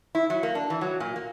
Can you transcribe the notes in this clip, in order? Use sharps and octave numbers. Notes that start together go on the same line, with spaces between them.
E4
F#3
A#3
D4
E3
F#3
A#2
A#3